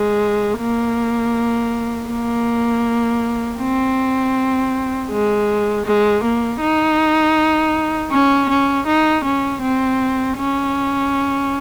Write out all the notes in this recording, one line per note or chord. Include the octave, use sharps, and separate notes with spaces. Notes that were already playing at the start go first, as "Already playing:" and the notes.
Already playing: G#3
A#3
A#3
C4
G#3
G#3
A#3
D#4
C#4
C#4
D#4
C#4
C4
C#4